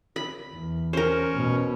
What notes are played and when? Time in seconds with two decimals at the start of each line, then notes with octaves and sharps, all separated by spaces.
0.16 B5
0.52 E2
0.93 C#4 A#4 C5
1.35 B2